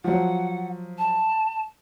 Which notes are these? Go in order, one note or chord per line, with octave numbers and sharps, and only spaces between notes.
F3 F#3 F#5
A5